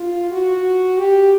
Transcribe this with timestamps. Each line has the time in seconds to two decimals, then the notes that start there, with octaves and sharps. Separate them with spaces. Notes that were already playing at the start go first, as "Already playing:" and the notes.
Already playing: F4
0.32 F#4
0.98 G4